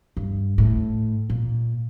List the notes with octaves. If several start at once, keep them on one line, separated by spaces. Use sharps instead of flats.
G2
A2
A#2